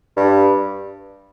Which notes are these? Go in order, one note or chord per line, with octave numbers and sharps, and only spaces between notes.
G2